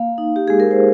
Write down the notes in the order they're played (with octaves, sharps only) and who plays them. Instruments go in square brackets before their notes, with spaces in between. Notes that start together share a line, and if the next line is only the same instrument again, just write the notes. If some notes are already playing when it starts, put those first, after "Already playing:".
Already playing: [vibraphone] A#3 F5
D#4
G4
G#3 G#4
A#4
C5